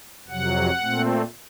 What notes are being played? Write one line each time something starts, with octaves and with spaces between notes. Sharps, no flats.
F2 C3 F#3 F#5
A#2 A3 C4